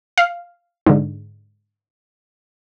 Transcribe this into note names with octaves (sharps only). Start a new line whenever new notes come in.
F5
G#2 D3